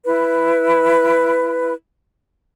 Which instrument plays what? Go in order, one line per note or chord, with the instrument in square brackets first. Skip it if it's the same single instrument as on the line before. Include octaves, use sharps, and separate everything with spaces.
[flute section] E4 B4